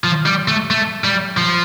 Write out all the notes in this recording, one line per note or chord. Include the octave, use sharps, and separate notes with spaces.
F3
G3
A3
A3
G3
F3